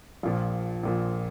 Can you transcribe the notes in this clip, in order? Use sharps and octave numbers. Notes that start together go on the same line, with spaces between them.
A#1 A#2 F3 F4
A#1 A#2 F3